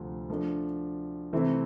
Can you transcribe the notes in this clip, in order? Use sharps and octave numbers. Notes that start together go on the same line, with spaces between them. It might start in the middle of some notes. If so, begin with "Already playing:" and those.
Already playing: D2 C3 F3 C4 F4
F3 A3 D4
C3 E3 A3 C4 E4